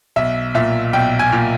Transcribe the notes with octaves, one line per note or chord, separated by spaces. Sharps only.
B1 E5
A#2 E5
B1 G5
G#5
A#2